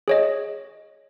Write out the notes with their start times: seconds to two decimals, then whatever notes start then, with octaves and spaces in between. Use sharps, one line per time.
0.08 G#4 C#5 D#5